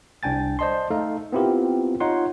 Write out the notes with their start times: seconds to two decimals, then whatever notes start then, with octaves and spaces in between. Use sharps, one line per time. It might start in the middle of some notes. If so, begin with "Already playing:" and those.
0.23 C2 D4 G5 G#5 A6
0.59 C5 D5 D#5 A5 C6
0.91 A3 D#4 A4 F5
1.32 B3 C4 E4 F4 G4 A#4
2.00 D#4 F4 C#5 F#5 C6